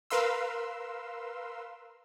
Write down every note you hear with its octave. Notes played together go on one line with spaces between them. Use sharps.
A#4 B4 F5 C6 E6